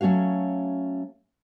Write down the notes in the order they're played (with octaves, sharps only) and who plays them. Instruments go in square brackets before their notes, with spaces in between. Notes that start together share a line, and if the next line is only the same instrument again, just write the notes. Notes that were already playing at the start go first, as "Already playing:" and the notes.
[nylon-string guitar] F#3 A3 C#4 F#4 F5